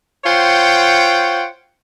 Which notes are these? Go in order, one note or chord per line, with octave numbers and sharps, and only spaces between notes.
F4 C5 C#5 F#5 G5